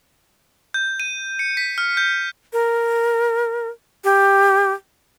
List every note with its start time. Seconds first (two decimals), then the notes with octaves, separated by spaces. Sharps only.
0.74 G6
1.00 D#7
1.39 C#7
1.57 B6
1.78 F6
1.97 G6
2.53 A#4
4.04 G4